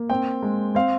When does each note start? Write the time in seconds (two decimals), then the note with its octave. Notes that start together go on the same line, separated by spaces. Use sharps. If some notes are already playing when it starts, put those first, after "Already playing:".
Already playing: A#3
0.10 C4 G5
0.42 G#3
0.75 C4 F5